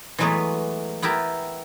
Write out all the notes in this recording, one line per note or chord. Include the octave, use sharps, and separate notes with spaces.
E3 F#3 G#3 A3 B3 B4
B3 E4 G4 A#4 A5